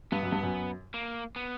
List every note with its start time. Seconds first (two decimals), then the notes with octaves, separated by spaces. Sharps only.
0.12 G2 B3
0.23 F#2
0.32 G2
0.43 F#2
0.94 A#3
1.36 B3